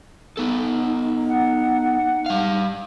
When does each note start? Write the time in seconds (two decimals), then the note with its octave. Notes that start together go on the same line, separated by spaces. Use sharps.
0.37 B3 D#4 A4
1.29 F#5
2.26 G3 F5